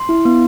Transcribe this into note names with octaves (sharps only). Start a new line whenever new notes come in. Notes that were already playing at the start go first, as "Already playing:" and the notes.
Already playing: C6
E4
B3